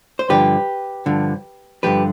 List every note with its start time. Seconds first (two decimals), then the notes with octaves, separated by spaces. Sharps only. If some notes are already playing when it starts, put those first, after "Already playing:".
0.19 C5
0.29 G2 D3 F3 G4 B4
1.06 G2 D3 F3
1.83 G2 D3 F3 G4 B4